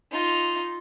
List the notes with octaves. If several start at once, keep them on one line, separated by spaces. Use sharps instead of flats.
D#4 F4